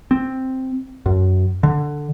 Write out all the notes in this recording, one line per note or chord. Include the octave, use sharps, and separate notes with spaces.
C4
F#2
D3